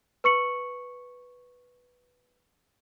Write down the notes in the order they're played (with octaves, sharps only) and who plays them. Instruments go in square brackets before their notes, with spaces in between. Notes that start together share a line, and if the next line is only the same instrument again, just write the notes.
[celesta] B4 C#6 C#7 F#7